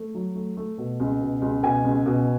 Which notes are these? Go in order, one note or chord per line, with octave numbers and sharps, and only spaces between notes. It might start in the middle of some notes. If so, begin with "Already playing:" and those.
Already playing: A3
F#3
A3
A3
B2
C#2
B2
C#2
B2 G#5
C#2
B2